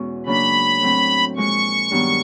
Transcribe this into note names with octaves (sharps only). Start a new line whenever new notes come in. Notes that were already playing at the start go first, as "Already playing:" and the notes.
Already playing: E2 B2 G#3 C#4 F#4
C#3 F#3 A#3 D4 B5
A2 F#3 A3 C4
A#2 F3 G#3 C#6
G2 D#3 F#3 B3 D#4